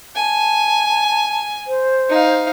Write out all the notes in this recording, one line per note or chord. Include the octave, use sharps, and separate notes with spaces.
G#5 A5
C5
D#4 F5